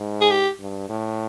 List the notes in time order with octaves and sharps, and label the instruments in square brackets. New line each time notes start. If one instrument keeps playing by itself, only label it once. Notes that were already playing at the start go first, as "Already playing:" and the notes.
Already playing: [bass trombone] G#2
[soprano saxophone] G#4
G4
[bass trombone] G2
A2